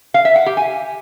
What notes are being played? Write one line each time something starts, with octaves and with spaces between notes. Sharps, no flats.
F5
E5
F#5
G4
G#5